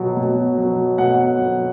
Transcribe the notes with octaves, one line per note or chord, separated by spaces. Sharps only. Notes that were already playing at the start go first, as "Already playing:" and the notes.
Already playing: B2 F#3
B2
F#3
B2 F#5
F#3